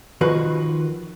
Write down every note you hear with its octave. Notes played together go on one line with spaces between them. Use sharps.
D#3 F3 F#4 B4